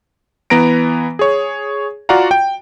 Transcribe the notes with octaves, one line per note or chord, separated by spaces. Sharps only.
E3 B3 A#5 A#6 D7
G#4 C#5
F4 F#4 D5 F5 F#5 A#5
G5